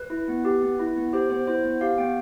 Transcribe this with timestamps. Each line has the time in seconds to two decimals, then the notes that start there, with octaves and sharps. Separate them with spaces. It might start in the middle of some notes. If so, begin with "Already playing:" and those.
Already playing: B4
0.10 E4
0.28 B3
0.45 G4
0.62 B3
0.79 E4
0.96 B3
1.13 G4 C5
1.30 B3 C5
1.47 E4 C5
1.64 B3
1.81 G4 F5
1.98 B3 G5